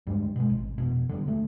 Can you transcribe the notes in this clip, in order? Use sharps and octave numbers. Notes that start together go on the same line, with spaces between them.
D2 G2 G3 G#3
B2 G#3
G#1
F1 B2
D3 D#3 G3
D1 D3 A3